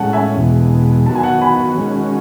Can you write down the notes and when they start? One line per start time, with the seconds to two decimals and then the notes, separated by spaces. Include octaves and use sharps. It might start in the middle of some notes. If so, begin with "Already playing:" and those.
Already playing: A2 G#3 C#4 F#5 A5
0.13 E5 G#5
0.36 E2 B2 G#3
1.06 D#3 F#3 B3 F#4 A5
1.15 G#5
1.23 F#5 A5
1.42 G#5 B5
1.77 D#3 G#3 C#4 F#4